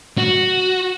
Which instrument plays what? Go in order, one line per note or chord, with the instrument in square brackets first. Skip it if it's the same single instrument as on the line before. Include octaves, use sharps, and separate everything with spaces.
[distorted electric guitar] F#4